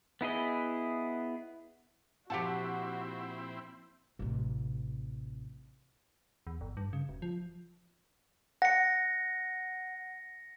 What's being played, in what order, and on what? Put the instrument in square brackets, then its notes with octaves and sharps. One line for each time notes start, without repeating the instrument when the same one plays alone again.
[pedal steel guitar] B3 E4 G#4 D#5
[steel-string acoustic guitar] A#2 F3 [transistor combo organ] C4 E4 [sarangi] F#4 [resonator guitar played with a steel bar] G4 F#5 A5
[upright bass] A1 C3
[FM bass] E2
G1
G2
C#3
E1
F3
[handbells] F#5 [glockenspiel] A#6 C#7